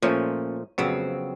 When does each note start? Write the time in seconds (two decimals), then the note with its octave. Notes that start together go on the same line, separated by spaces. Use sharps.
0.02 A#2 F3 A3 C#4
0.78 F2 C#3 F#3 B3 C4